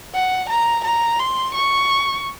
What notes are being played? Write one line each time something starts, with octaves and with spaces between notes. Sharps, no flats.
F#5
A#5
A#5
C6
C#6